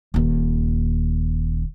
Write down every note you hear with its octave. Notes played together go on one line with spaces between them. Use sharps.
D#1 D#2